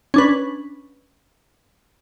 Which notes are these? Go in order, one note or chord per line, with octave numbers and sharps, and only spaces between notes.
C#4 D4 B4